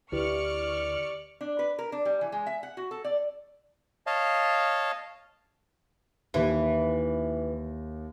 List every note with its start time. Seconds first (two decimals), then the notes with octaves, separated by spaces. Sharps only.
0.12 D2 E4 G4 B4 D5 C#6 F6 C#7
1.41 D4
1.59 B4
1.79 A#4
1.92 D4
2.05 G3
2.21 E3
2.32 G#3
2.46 E5
2.63 F#5
2.77 F#4
2.91 A4
3.04 D5
4.07 C#5 D#5 F5 A5
6.34 D#2 E3